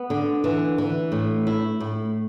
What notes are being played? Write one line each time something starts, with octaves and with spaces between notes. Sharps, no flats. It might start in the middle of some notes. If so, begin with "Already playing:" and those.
Already playing: B3
D3
E3
E3
A2
E4
A2